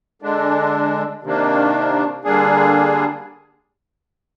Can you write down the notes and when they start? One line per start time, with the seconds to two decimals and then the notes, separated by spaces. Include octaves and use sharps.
0.22 D3 G#3 D4
1.23 C3 D#3 A#3 D4
2.24 D3 G3 A#3 D4 G#4